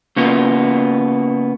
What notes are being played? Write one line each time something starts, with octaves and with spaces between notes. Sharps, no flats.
C#3 A#3 B3 F4